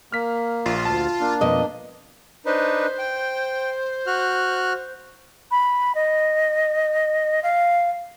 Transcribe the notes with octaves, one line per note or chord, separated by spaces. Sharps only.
A#3 F6 B6
A#1 F4
D2 A5
A#3 D4
F2 B2 D#5
D4 D#4 B4 C5
G5
F#4 F6 F#6
B5
D#5
F5